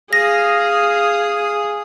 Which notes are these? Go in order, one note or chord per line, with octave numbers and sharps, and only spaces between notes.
G#4 F5 D#6 A#6